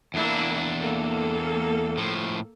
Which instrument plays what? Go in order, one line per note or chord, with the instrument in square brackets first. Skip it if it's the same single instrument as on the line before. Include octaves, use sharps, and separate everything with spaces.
[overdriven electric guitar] E2 D4 [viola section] A#3 E4
[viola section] A#3 A4
[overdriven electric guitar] A2 F3